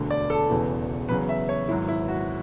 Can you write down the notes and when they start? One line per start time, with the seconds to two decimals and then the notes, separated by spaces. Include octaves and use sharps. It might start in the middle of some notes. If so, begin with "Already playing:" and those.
Already playing: E1 D2 D3
0.11 D5
0.30 A4
0.49 E1 E2 C#3 E3
1.09 E2 C#3 F#3 B4
1.29 E5
1.49 C#5
1.68 G#1 G#2 F#3 E4
1.88 E4
2.08 F#4